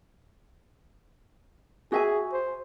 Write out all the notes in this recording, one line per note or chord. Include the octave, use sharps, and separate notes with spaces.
F#4 G#4 E5 G#5
C5